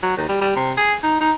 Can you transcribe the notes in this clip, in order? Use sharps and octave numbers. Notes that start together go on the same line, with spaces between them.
F#3
D#2
G3
G3
C3
G#4
D#4
D#4